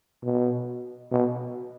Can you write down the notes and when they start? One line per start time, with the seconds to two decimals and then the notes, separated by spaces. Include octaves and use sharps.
0.23 B2
1.11 B2